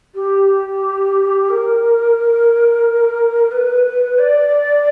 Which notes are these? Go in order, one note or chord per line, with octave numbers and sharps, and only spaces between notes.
G4
A#4
B4
D5